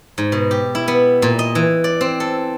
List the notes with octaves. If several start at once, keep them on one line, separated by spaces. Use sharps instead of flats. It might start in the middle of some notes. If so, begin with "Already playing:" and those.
G#2
B2
G4
E4
B3
A#2
D#5
E3
D5
C4
A4